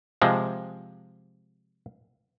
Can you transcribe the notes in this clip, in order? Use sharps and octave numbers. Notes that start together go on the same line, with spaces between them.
C3 F3 G#3